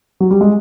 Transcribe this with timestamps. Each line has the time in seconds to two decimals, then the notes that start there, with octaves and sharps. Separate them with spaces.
0.20 F#3
0.31 G3
0.41 G#3